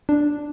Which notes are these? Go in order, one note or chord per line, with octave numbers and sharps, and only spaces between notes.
D4